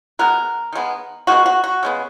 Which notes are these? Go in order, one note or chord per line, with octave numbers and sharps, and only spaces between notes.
B2 G#3 B3 A#4
D#3 G#3 B3
D#3 G#3 B3 F#4
F#4
F#4
C#3 G#3 B3